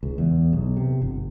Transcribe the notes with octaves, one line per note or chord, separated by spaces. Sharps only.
C#2
E2
B1
C3
G1